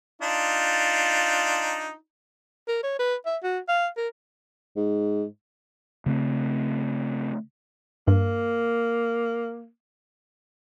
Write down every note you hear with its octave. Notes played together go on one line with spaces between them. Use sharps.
D4 D#4 F4
A#4
C#5
B4
E5
F#4
F5
A#4
G#2
C#3 A3 C4
G2 A#3